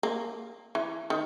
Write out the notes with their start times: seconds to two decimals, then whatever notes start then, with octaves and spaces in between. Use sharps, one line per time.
0.03 A#3
0.75 E3
1.10 D#3